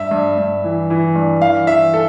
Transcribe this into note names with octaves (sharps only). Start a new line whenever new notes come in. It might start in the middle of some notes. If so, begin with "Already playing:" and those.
Already playing: G2 E5
G2
G2
E3
E3
G2
E3 F5
E3 E5
A4